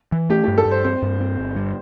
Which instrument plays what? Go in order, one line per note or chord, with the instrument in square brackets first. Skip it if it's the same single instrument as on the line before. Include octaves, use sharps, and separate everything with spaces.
[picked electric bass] E3
[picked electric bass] A3 [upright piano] G4
[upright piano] G4
[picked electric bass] G2
[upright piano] A4
[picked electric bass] G2
[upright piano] C5
[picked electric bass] C4 [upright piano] C5
[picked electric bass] G2
C4
G1
G2